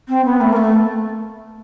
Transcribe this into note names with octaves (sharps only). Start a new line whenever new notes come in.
C4
B3
A3
A#3
A3